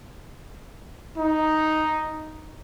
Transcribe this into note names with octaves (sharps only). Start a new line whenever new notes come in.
D#4